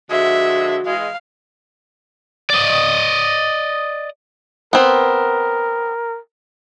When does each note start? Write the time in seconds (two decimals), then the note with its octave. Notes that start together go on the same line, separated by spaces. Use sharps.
0.10 D3 F3 G#3 F#4 E5
0.86 E3 G#3 F5
2.50 D5 D#5
4.73 B3 C4 A#4